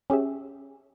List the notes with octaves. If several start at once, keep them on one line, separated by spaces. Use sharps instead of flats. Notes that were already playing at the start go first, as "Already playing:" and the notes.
C#4 G4 G#4 E5